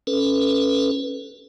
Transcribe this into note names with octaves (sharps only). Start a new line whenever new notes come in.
C#4 A4 B4